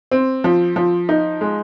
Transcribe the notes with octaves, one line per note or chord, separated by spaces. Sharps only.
C4
F3
F3
D#4
G#3